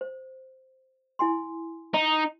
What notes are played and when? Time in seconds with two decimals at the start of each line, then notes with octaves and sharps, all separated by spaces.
0.01 C5
1.19 E4 G#5 C6
1.94 D#4